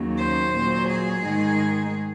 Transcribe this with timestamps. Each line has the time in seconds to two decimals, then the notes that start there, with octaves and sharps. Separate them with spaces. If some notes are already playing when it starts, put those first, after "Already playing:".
Already playing: D#2 C#3 F#3
0.18 C5
0.53 A#2 F#3
0.87 G#4
1.21 G#2 D#3 G#3